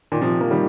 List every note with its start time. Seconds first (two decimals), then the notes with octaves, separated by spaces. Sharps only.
0.12 A#2 D#3
0.21 C3 F3
0.41 F3 A#3
0.51 D#3 G3